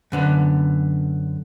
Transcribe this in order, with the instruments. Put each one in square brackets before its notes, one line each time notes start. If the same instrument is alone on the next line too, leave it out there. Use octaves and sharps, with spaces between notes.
[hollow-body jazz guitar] F#2 D3 B3